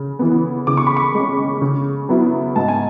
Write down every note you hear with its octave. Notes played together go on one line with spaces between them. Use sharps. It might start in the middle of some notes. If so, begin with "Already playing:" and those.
Already playing: C#3
E3 B3
C#3 D6
C#6
B5
C#6
G#3 C#4
C#3
F#3 B3 E4
G#2 A5
G#5